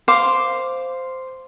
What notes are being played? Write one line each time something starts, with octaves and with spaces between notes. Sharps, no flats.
C5 F5 D6